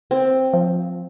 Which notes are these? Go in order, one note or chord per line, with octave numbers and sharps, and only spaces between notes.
C4
F3